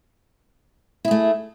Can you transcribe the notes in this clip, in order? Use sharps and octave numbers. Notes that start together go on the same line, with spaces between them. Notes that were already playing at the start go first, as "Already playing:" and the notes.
A3 E4 G#4